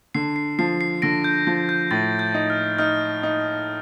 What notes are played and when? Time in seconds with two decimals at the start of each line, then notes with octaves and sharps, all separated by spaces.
0.15 D3 C7
0.36 C7
0.59 F3 C7
0.81 C7
1.02 D3 A#6 D7
1.24 G6
1.47 F3
1.69 G6
1.91 A2 A6
2.19 G6
2.34 D#4
2.50 F6
2.78 D#4 F6
3.23 D#4